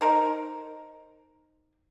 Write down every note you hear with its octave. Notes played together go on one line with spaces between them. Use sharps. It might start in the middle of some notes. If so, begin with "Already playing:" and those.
D#4 A#4 C5